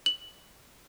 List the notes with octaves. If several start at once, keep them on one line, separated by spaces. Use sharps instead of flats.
F#7